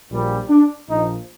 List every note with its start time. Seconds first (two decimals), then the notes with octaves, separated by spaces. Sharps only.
0.11 A#1 A#2 G3
0.49 D4
0.88 A#1 A#2 F3 D#4